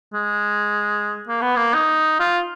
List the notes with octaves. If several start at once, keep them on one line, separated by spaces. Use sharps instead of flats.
G#3
A#3
B3
A#3
D#4
F4